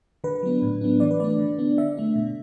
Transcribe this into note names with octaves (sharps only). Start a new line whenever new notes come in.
D3 B4
F#3 B3 D4
A2
F#3 B3 D4
E3 D5
B4
A3 D4 D5
D3
B3 D4
D3 E5
A3 D4
B2